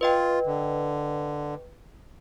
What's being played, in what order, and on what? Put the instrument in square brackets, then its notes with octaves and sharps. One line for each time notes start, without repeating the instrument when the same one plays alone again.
[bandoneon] F4 [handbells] B4 D#5 G5
[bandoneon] D3